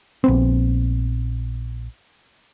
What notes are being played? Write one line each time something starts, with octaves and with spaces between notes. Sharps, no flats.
A#1 B3 C4